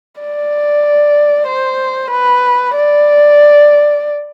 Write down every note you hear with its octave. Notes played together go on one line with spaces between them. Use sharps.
D5
C5
B4
D5